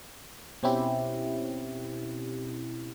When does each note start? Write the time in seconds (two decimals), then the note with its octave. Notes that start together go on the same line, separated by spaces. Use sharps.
0.63 B2 C4 C#4 E4 G4